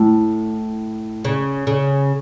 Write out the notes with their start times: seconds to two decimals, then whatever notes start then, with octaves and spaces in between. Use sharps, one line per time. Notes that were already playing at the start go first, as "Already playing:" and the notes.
Already playing: A2
1.25 C#3
1.67 C#3